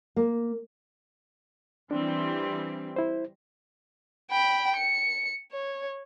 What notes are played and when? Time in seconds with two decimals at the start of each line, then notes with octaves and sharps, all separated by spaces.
0.16 A#3
1.91 E3 G3 C4 D4
2.96 E4 C5
4.31 G5 B5
4.77 C#7
5.52 C#5